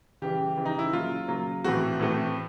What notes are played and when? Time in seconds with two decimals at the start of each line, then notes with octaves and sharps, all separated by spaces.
0.22 C#3 E3 G3 G4
0.57 C#3 E3 G3
0.66 D#4
0.79 E4
0.93 C#3 F#3 A#3 F4
1.28 C#3 F#3 A#3
1.64 A2 E3 A3 C4 F#4
1.99 A2 E3 A3 C4